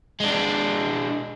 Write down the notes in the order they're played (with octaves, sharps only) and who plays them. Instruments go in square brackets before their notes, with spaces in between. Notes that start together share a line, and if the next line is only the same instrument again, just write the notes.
[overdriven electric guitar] G#3 D4